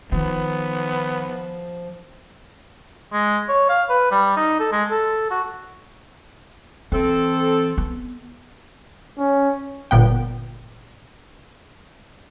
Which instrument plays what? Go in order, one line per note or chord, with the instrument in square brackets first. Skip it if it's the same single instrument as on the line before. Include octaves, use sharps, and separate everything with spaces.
[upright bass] D#3 [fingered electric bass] F3 [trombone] B3
[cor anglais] G#3
C#5
F5
B4
G3
D#4
A4
G#3
A4
F#4
[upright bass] E3 [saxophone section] C4 A4
[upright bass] B3
[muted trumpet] C#4
[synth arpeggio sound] G1 A#2 B3 G5